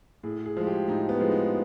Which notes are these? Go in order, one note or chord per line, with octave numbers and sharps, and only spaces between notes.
A2 G#4
G#4
F3 G#3
G4
A2 D#4
B3
F3 G#3
D#4